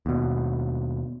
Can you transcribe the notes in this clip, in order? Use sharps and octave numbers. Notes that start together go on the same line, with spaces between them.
D#2 B2